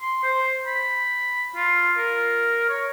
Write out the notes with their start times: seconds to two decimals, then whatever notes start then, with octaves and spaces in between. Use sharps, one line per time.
0.01 C6
0.24 C5
0.67 B5
1.56 F4
1.98 A#4
2.69 C#5